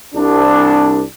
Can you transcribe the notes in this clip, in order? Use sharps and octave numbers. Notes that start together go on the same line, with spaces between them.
C2 D4